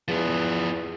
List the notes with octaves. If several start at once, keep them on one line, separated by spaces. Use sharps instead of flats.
E2 F3 B3